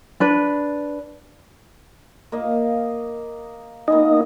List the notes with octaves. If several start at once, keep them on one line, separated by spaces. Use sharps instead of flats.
D4 B4
A#3 D#5 F5
A#3 B3 D#4 D#5 G#5